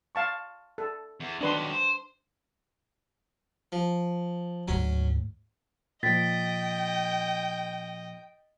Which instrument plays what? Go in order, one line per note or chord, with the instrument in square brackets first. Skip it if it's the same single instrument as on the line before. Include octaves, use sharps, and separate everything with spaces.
[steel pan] F5 A5 C#6
A4
[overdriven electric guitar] E2
[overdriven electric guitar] D#3 F#3 [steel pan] D4 B4 C6
[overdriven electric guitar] C5
[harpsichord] F3
[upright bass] D2 G#2 [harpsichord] F#3 C#4
[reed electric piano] A#2 F3 [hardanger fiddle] D#5 [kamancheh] G5 [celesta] A6 B6